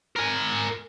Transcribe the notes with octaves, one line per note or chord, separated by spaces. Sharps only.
A#4 G#5